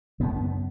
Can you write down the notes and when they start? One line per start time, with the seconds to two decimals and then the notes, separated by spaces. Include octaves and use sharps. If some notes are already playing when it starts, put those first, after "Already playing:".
0.20 F#2 C#3 B3
0.36 C#4
0.40 B3